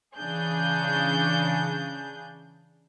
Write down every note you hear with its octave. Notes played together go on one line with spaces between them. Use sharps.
C#3 E3 D4 G#4 G6